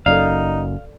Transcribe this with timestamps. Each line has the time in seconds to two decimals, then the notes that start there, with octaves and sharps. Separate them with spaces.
0.06 F#1 F#2 D#4 A4 D5 F5